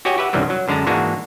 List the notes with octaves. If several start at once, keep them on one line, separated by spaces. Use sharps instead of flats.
F#4 G4 C#5 D#5 G5 G#5
G4 B4 E5 F#5
C2 F#2 D#3 E3 F#3 G3
F#3
F#2 D3 G#3 A5 A#5
G#2 E3 G#3 A#3 D4 F#4